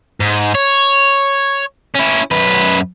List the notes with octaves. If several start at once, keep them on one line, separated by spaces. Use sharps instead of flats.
G#2
C#5
C#4 E4
F#2 B4